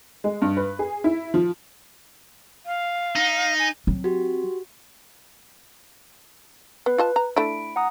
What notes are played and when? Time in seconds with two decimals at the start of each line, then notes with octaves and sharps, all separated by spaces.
0.24 G#3
0.42 G2
0.57 B4
0.79 G#4
1.04 E4
1.34 F3
2.66 F5
3.16 D#4
3.59 G#5
3.87 F#3 C4
4.04 F#4 G4
6.86 B3 B4
6.98 F4 D#5 A5
7.16 A#5
7.36 A3 D4 E4 B5 D7
7.76 F#5 A#5 D#6